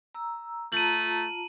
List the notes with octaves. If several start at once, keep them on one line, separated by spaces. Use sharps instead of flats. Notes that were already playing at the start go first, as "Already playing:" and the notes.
A#5 E6
A3 F4 A5 A#5 D#7 F#7